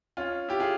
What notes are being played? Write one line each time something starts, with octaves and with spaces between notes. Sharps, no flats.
C#4 F4
E4 G4
F4 G#4